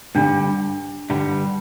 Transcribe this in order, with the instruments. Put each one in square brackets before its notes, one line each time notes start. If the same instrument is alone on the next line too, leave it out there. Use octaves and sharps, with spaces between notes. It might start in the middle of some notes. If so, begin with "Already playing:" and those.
[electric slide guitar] G2 D3 G3 [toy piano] D4
[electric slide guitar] G2 D3 G3